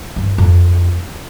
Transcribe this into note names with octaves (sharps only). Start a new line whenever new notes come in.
G2
F2